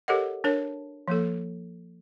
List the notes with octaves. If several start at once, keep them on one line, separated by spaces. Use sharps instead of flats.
G4 A4 A#4 C#5 D#5 F#5
D4 A#4 C#5 A5
F3 A#3 A4